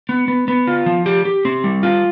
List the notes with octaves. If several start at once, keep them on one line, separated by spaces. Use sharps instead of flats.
B3
B3
B3
F4
F3
G4
G4
C4
G3
F4